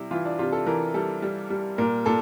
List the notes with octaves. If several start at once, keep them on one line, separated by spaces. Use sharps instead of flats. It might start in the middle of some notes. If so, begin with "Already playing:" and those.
Already playing: C3 G3 E4
E3 F4
D4
C3 F4
A4
E3 A#4
G3 A4
G3
G3
A#2 A#4
A#2 A4